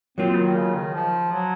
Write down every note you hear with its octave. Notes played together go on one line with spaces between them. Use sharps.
F#3 A#3 C4 F4
D#3
C#3
D#3
F3
F#3